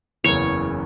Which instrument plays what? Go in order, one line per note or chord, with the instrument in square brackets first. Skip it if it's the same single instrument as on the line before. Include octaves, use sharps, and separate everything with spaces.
[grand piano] F#1 E2 C#3 E3 [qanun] C#5